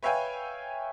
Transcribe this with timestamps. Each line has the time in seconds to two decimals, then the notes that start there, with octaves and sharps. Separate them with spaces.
0.03 B4 C#5 E5 F5 G5 G#5